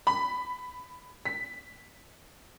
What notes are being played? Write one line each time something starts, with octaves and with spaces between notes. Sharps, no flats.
B5
B6